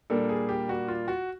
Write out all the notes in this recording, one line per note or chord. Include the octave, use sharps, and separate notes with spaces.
A#2 G3 A#3 D4 A4
G#4
G4
F#4
F4
F#4